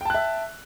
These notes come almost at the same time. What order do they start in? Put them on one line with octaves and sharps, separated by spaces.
G5 A5 F#6 E5